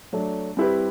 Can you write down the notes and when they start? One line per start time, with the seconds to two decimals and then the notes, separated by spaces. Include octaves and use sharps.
0.13 F#3 A3 D4
0.57 G3 C4 E4 G4 B4